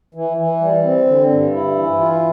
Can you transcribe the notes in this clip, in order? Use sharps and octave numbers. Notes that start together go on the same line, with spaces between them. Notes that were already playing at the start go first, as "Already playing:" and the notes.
E3
E3
G3
C4
D3
G2
E4
E3
F4